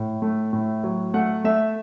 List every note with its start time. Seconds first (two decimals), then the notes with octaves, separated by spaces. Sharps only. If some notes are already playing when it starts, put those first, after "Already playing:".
Already playing: A2
0.22 A3
0.53 A2
0.83 F#3
1.14 A3 F#5
1.44 A3 E5